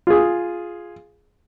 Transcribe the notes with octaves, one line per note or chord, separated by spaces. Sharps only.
F4 G#4